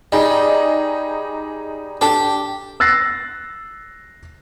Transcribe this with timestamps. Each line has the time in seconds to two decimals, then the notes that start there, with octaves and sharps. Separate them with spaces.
0.12 G3 D#4 G#4 D#5
2.01 D4 G4 A4
2.80 E6 F#6 A6 A#6 C7